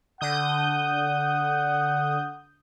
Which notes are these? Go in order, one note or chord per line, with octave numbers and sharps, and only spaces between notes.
D3 F#5 D#6 G6